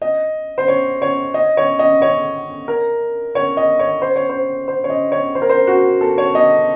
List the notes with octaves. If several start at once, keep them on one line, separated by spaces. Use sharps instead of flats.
D#5
C5
C#5
C#5
D#5
C#5
D#5
C#5
A#4
C#5
D#5
C#5
C5
C#5
C5
C5
C#5
D#5
C#5
C5
A#4
C5
F#4
A4
C#5
D#5